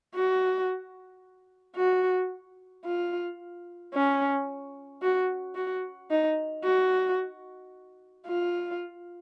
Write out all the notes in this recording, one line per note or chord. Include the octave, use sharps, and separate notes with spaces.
F#4
F#4
F4
C#4
F#4
F#4
D#4
F#4
F4